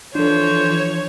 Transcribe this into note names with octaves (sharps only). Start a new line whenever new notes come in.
E3 F3 D4 A4 C5 C#5